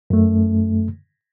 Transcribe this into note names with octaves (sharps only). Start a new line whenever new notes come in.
F#2 A3